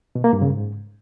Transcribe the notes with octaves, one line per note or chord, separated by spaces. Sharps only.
B2
A#3
G2
C#3
G#2